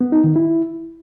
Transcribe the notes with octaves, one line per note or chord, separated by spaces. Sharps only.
B3
D#4
D#3
E4